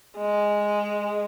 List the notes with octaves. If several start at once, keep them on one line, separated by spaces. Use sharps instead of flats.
G#3